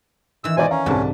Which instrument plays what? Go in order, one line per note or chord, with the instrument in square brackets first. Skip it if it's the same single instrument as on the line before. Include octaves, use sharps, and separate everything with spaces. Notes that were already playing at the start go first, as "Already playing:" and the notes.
[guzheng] D#3 E3 [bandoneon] E6
[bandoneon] G#2 B2 G#5 [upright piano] C5 D5 D#5
[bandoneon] C#4 [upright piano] E5 F5 A#5
[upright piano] C2 A5 [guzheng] G#2 D3